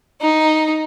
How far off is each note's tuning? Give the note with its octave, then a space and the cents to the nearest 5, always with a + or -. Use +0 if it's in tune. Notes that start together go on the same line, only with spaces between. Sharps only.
D#4 +5